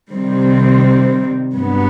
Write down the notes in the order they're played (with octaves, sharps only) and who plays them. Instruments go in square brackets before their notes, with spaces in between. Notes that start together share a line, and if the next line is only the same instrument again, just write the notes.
[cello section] C3 D#3 G3 C4
G2 F#3 B3